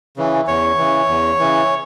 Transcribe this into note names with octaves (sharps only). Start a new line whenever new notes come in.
C#3 E3
E2 C#5
C#3 E3
E2
C#3 E3